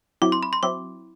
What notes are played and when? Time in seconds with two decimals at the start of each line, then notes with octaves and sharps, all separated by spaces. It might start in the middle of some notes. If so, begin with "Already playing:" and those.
0.22 F#3 C4 E4 D6
0.32 C6
0.43 B5
0.53 C6
0.63 F#3 C4 E4 D6